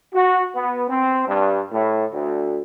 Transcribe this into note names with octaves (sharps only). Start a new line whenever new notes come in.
F#4
B3
C4
G2
A2
D2